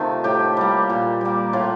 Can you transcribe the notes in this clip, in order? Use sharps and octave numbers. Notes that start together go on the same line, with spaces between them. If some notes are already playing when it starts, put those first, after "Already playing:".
Already playing: C3 D#3 A3 F4
A2 G4
G3 A#3
A#2
G3 A#3
A2 F4